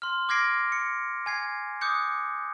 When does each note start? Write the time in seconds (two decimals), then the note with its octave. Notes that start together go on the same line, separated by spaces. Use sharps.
0.02 C6 F6
0.29 D6 F6 G#6 A#6 C7 D7
0.72 C#7
1.26 G#5 G#6 C7
1.81 D6 D#6 F#6 G6 C#7